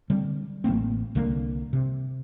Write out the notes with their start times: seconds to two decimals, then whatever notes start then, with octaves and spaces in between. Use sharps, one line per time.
0.10 D3 G3 C4
0.64 A1 F#3 A#3 C4
1.15 C2 D3 A#3
1.73 C3